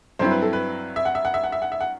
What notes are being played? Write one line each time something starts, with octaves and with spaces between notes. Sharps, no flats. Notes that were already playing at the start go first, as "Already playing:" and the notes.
G2 F#3 C4 E4 C5
B4
A4
B4
E5
F#5
E5
F#5
E5
F#5
E5
F#5
E5
F#5